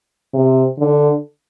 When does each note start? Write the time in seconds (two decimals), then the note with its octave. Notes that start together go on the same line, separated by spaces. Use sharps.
0.34 C3
0.79 D3